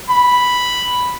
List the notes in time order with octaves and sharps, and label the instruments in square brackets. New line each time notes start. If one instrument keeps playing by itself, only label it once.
[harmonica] B5